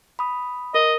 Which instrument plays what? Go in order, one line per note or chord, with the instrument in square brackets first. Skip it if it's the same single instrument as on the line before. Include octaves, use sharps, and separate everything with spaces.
[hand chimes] B5 D#6
[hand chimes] A#4 [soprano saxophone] D#5